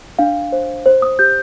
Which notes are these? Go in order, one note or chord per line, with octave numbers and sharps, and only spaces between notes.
D4 F5
C5
C5
D#6
G4 G6